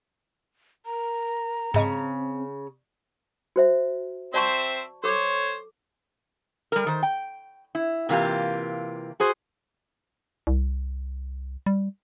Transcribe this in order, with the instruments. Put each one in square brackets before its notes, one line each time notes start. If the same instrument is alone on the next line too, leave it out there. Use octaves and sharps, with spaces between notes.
[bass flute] A#4 [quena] A#5
[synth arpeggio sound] G#2 D#5 C#6 [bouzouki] C#3 [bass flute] C4
[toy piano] F#4 C5 E5
[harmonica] C4 C5 E5 [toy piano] D5 A5 C#6
[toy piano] A4 D6 [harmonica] C5 C#5
[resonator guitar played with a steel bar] G3 A#4
D#3 C5
G5
E4
C3 E3 A#3 F4 G4
F#4 G#4 C5
[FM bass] C2
G3